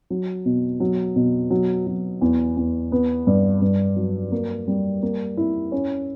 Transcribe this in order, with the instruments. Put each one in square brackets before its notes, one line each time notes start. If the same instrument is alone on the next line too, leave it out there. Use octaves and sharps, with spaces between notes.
[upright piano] F#3
B2
F#3
B2
F#3
F#3
E2
E2
B3
G2
G2
F#3
A#3
G3
A#3
E4
C#4